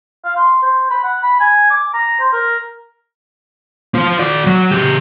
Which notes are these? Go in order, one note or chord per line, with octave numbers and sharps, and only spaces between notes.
F5
C6
C5
B5
F#5
B5
G#5
D6
A#5
C5
A#4
F4 C5
F#4 D5
F#3
C#3 G4